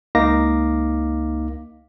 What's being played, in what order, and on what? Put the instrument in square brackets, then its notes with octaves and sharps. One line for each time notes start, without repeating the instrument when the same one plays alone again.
[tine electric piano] C#2 A#3 D#4 F5 D6 A#6